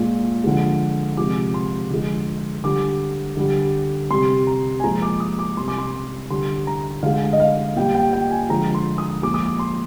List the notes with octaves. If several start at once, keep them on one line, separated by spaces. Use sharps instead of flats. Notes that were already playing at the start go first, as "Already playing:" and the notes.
Already playing: A#2 G#3
D3 F3 G#3
C3 F3 G#3 D6
C6
D3 F3 G#3
D3 G3 D6
D3 G3
C3 G3 C6
A#5
G#5
A#2 F3 G#3 A#5
D6
D#6
D6
C3 G3 C6
D6
C6
D3 G3 C6
A#5
D3 G#3 F5
D#5
F5
A#2 G3 G5
G5
G5
G#5
D3 F3 G#3 A#5
C6
D#6
A#2 F3 G#3 D6
D#6
D6
C6